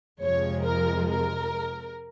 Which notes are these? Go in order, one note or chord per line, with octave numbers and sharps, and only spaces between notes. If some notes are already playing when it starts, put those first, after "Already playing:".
F2 C3 F3 G#3 C#5
A#4
A#4